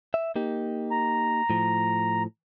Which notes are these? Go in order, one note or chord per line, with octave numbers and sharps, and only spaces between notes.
E5
A#3 D#4 G4
A#5
A2 F3